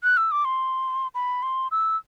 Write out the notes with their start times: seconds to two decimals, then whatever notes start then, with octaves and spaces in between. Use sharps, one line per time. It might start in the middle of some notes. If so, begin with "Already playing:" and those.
0.04 F#6
0.17 E6
0.32 D6
0.45 C6
1.15 B5
1.43 C6
1.71 E6